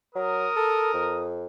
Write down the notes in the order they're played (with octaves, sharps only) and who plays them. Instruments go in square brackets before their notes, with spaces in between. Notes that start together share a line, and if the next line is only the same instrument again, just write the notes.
[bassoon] F#3 [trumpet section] A#4 D#6
[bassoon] A4
F2